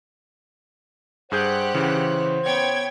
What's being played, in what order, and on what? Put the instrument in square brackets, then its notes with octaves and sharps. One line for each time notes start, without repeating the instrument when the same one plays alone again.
[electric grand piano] G2 G#4 G6 [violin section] G4 F#5 F#6 [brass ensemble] C5
[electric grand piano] C#3 E3
[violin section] B3 G5 G#6 [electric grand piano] C#5